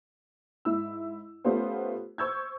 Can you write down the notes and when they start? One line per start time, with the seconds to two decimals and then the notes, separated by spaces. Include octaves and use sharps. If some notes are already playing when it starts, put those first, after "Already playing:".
0.65 G#2 E4 E6
1.44 A3 B3 C#4 F4 G4 C5
2.18 C5 C#6 E6 G6 G#6